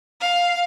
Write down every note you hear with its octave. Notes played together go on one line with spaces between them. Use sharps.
F5